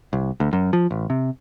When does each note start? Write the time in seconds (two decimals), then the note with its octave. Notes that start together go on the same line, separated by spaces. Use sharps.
0.13 C2
0.40 D2
0.53 F#2
0.73 F3
0.91 A1
1.10 C3